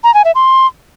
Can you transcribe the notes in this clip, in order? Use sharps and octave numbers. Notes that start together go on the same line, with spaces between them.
A#5
G#5
E5
C6